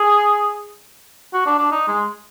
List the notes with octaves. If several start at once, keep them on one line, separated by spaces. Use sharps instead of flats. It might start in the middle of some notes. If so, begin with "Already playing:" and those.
Already playing: G#4
F#4
D4
D4
D#4
G#3